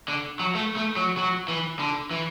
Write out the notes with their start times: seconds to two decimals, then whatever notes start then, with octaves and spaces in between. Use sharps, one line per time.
0.08 D3
0.40 F#3
0.55 A3
0.76 A3
0.97 F#3
1.17 F#3
1.48 E3
1.79 D3
2.11 E3